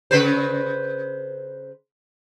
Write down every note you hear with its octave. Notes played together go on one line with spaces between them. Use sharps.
C#3 B4 C5